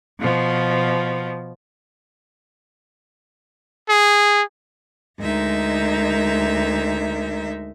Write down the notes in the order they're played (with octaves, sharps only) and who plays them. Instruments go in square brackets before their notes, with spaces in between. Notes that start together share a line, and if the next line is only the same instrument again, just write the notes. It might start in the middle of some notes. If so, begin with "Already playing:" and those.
[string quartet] B2 F3
[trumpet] G#4
[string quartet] D2 G#3 D#4 A#4 E5